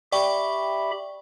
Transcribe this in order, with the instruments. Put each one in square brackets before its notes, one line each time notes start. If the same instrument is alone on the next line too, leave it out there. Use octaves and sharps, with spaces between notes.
[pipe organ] G4 E5 B5 [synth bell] D5 G5 C#6